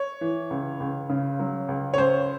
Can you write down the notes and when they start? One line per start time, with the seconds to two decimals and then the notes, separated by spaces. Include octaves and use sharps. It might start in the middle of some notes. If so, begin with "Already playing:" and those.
Already playing: C#5
0.21 E3
0.50 C#2
0.80 C#2
1.09 C#3
1.39 F#3
1.68 C#2
1.94 C#5
1.98 C#2 C5